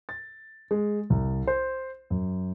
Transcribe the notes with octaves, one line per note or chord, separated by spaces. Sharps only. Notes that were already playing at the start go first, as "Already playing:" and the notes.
A6
G#3
C2
C5
F#2